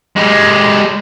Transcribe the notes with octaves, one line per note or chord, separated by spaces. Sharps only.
G#3 G4